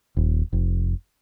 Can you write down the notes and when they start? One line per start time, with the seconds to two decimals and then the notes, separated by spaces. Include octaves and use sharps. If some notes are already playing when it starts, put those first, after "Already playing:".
0.17 D#1
0.53 F1